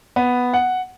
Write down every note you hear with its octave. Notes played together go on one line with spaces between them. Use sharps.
B3
F#5